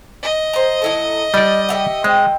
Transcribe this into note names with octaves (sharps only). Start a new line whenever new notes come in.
D#5
C5 A#5
F#3 E4 A4
G3 D#4 D5
G4 E5 F#5
G#3 C4